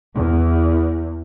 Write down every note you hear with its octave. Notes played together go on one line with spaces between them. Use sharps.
E2